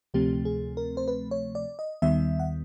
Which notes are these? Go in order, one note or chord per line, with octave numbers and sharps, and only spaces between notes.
D2 C3 F3 A3 C4 G4
G#4
A#4
C5
B4
C#5
D5
D#5
D#2 D#3 G3 B3 E5
F#5